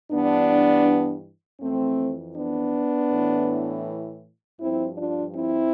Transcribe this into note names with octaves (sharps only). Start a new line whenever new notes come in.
G2 E3 B3 D4
F2 E3 A3 C4
B3 D4
A2 E3
G2 F3 C4 E4
D4 F4
C4 E4